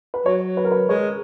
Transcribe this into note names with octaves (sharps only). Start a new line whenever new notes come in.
B4
F#3 C#5
B4
A#4
B4
G#3 C#5